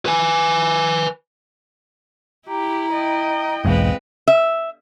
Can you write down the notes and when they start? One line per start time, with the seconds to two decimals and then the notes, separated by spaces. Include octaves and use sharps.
0.06 B4 G#5
2.48 E4 G4 A#5
2.92 D#5 G5
3.65 B1 E2 G#2 G#3 C4 B4 F5
4.28 E5